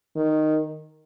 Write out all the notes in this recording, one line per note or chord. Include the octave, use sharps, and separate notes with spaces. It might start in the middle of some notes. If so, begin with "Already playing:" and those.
D#3